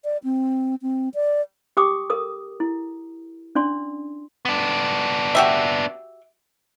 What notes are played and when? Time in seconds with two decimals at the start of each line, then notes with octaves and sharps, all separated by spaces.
0.04 D5
0.24 C4
0.82 C4
1.14 D5
1.77 G4 G5 D6 D#6
2.10 A4 A#4 D#6
2.60 E4
3.55 C#4 D4 D5 C6
4.45 B3 D4
5.35 F#4 G4 E5